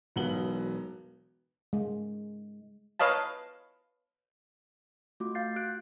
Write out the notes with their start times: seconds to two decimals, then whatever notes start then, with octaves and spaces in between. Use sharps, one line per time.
0.16 E1 B1 B2 B3 F#7 G7
1.73 G#3
2.99 B4 C#5 D#5 F5 A5
5.20 A3 F4 F#4 D6
5.35 F5 G6 A6 C7
5.56 F#4 F#6 D7